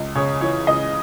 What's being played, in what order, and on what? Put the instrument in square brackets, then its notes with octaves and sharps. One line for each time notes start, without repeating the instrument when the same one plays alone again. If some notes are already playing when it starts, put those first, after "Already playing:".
Already playing: [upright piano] C#2
C#3 C#5
E3 C#5
C#2 D#5